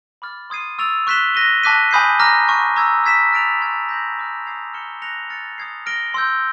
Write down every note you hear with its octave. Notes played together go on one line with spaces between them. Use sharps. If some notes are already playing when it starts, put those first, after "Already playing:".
B5 D6 F6 A6
C6 D#6 G#6 C7 D#7
C#6 E6 A6 D7 F7
C#6 F#6 B6 E7 G7
F#6 A#6 D#7 G7
A5 D6 F#6 B6 D#7
G#5 B5 D#6 G6 C7
A#5 D6 F6 A#6
G#5 C#6 F6
A#5 C#6 E6 G#6
E6 G#6 B6 E7
F6 A6 D7 F7
C6 F6 G#6 B6
B5 E6 G6 A#6
B5 D6 F6
D#6 G#6 C7 F7
F6 G#6 C#7 E7 G7
F#6 A#6 C#7 F7
F6 A6 C#7
D#6 G#6 C7
F6 A#6 D7 G7
C6 E6 G6